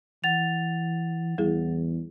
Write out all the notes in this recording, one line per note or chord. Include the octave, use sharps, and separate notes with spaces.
E3 F#5 A6 F7
E2 G3 E4 G#4